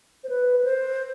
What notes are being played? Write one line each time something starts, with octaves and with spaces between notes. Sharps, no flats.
C5
B4
B4
C5